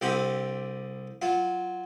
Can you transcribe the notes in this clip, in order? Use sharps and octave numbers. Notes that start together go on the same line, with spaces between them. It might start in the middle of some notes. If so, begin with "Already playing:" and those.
C2 D3 C4 G4 B5
F#3 F4